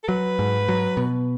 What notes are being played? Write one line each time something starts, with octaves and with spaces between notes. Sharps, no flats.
A4
F#3 B4
G#2
F#3
B2